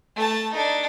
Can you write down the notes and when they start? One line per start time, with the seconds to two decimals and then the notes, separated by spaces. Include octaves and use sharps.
0.16 A3 A5
0.53 D4 D#4